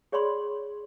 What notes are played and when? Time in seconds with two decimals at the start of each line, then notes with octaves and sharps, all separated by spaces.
0.12 G#4 C#5 D5 B5 C6